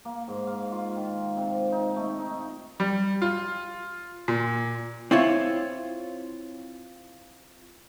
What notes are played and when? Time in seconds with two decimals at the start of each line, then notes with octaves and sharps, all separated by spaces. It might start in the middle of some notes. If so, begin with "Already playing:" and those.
0.05 A#3
0.28 G#2
0.47 F5
0.72 F4
0.96 D#3
1.37 C3
1.72 D#4
1.96 A3
2.19 D#4
2.80 G3
3.22 F4
4.28 A#2
5.11 C4 E4 F4 C#5